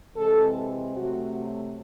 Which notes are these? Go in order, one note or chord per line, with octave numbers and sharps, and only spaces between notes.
C3 E3 G#3 C4 A4
C3 F#3 A3 F#4